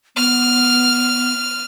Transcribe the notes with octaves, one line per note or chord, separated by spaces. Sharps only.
B3 F6